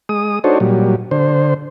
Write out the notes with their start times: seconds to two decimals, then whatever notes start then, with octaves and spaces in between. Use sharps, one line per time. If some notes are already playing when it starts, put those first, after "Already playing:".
0.09 G#3 D#6
0.44 D4 D#4 F#4 A4 C5 C#5
0.60 A#2 F#3 G3
1.11 D3 C5